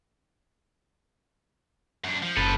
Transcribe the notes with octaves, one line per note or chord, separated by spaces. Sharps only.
F#2 D4
F3
F#1 A4 B4